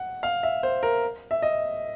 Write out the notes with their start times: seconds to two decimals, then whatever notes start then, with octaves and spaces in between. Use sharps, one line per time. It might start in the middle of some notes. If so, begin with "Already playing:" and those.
Already playing: F#5
0.23 F5
0.43 E5
0.63 C5
0.83 A#4
1.31 E5
1.42 D#5